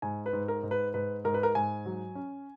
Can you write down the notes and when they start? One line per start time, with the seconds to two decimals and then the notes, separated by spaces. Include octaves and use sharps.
0.02 G#2 G#5
0.26 B4
0.33 G#2
0.48 A#4
0.63 G#2
0.71 B4
0.94 G#2 B4
1.24 G#2 A#4
1.34 B4
1.43 A#4
1.55 G#2 G#5
1.86 F#3
2.15 C#4